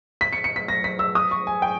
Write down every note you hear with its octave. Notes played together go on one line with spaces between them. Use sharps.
B6
C#7
C#7
B6
A#6
B6
E6
D#6
C#6
G#5
G5